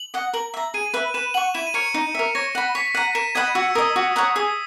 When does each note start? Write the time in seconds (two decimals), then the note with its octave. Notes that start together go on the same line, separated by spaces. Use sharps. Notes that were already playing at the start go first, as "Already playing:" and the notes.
Already playing: F#7
0.14 D#5 F#5
0.33 A#4 F#7
0.54 E5 A#5
0.74 G#4 D#7
0.94 B4 E5
1.14 B4 E7
1.34 F#5 C#6 F#7
1.54 E4 E7
1.67 D#7
1.74 A#4 C#5 C#7
1.94 D#4
2.15 A#4 E5
2.35 C#5 A#6
2.55 F#5 B5
2.75 C#5 B6
2.95 F#5 A#5 D#7
3.15 A#4 E7
3.35 D#5 F#5 B5 G#6
3.55 F#4 E6
3.68 E6
3.75 A#4 D#5 D#6
3.96 F#4
4.16 C#5 F#5 A#5
4.36 G#4 D#6